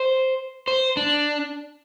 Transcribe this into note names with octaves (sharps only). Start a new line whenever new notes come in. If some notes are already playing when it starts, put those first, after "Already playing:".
Already playing: C5
C5
D4